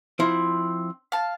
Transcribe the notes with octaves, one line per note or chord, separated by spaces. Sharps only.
F3 C4 E4
F5 A5